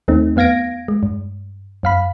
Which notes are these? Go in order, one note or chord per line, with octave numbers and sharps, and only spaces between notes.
D#2 A3 C4 D#4
F2 B3 F5 G#6 A#6 D7
G#3
G2
F#2 F5 B5